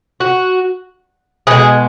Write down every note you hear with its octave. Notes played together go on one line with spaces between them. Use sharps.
F#4
B2 G#3 G#4